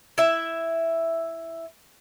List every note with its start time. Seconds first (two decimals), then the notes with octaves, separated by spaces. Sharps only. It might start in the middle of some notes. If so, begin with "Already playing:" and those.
0.18 E4 E5